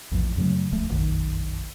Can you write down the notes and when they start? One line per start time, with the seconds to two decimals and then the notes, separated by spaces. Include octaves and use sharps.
0.11 A#1 E2 A2 F3
0.37 F#2 C#3 F#3 A3
0.72 D1 C#2 F3 A3
0.89 F1 A#1 F#2 D#3